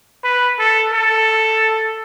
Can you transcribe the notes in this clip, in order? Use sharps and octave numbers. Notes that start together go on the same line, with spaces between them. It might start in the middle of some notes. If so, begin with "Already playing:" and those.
B4
A4
A4